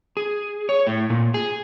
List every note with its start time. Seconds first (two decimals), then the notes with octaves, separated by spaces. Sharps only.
0.17 G#4
0.69 C#5
0.87 A2
1.10 A#2
1.34 G#4